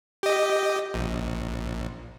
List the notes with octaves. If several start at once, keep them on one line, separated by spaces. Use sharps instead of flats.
G4 D#5
A#1